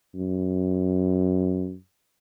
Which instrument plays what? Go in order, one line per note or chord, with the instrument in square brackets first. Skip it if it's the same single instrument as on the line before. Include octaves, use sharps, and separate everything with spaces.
[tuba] F#2